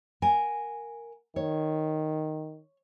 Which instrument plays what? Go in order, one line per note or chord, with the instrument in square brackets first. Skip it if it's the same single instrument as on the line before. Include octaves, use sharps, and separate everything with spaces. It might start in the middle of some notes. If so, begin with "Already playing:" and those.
[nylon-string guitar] A#4 F#5 G#5
[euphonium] D#3 [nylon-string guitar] C#5